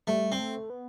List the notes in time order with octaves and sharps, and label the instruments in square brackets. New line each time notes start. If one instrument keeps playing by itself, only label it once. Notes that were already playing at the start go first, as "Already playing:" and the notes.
[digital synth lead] G3 [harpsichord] A3
[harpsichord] C4
[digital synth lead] A3
B3